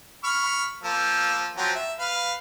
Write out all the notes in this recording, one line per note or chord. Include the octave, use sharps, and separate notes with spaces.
B5 C#6 F6
F3 A#3 E6
F3 F#3 C4
E5
B4 F5